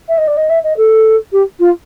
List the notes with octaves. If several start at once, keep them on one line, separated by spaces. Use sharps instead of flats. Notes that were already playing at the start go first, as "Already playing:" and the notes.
E5
D#5
D5
D#5
E5
D#5
A4
G4
F4